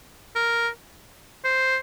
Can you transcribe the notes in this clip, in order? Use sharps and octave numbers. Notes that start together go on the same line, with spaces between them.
A#4
C5